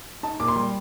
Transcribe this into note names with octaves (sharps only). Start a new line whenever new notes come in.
D#4 A5
A#2 D6
C6
G3